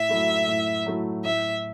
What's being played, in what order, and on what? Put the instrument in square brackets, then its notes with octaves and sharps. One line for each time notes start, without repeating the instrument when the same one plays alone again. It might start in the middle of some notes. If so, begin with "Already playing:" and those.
Already playing: [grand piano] A2 [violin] E5
[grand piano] F#3 A3 E4
A2
F#3 A3 E4
[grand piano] A2 [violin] E5